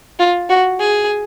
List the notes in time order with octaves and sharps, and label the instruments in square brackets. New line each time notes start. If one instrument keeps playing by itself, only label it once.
[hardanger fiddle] F4
F#4
G#4